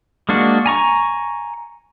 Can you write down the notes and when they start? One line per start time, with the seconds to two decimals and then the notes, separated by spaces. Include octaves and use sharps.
0.29 G#3 A#3 D4 F#4
0.66 G#5 A#5 C#6